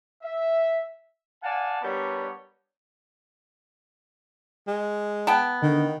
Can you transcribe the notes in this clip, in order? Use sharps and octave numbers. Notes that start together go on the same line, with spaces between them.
E5
D5 F5 F#5 G#5 A5
G3 B3 D4 A#4 C#5
G#3
B3 G5 A5
D3 D#3